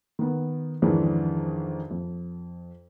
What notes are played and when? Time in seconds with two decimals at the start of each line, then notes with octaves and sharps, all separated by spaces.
0.19 D#3 B3
0.82 F2 G#2 D#3 E3 G#3 D4
1.91 F2